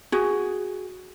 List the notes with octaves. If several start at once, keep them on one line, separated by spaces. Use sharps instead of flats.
F#4 G#4